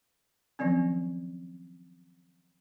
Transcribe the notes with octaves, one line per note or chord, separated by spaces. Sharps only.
D#3 F3 F#3 C4 C#4